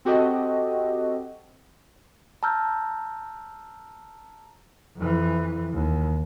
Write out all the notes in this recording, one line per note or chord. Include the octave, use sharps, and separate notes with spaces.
C4 F#4 G4 A4 D#5
A5 A#5 E6 F6 G6
F2 E3
D#2